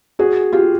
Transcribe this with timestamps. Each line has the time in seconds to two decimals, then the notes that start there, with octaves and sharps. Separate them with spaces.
0.19 F#4 G#4
0.53 F4 G4